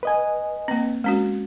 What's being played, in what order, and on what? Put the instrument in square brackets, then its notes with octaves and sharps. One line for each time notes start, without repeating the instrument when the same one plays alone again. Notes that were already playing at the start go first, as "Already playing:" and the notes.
[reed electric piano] B4 D#5 G#5
[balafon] A#3 C4
G#3 C#4 F#4